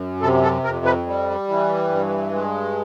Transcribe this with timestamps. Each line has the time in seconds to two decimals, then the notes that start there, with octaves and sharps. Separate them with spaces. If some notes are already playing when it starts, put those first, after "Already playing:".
Already playing: F#2
0.22 C3 A4
0.43 A4
0.64 F2 A#4
0.85 B4
1.06 G3
1.48 E3
1.90 G2
2.32 G#3